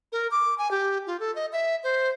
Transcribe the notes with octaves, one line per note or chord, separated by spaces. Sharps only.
A#4
D6
G#5
G4
F4
A4
D#5
E5
C5